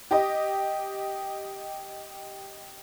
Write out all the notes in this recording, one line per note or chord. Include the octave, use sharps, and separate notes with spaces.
G4 D#5